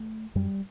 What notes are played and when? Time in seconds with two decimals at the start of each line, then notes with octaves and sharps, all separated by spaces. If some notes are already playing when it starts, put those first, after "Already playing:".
Already playing: A3
0.35 F#2 G3